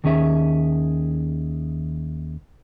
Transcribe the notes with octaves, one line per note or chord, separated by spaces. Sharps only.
D#2 D#3 C#4 G#4 E5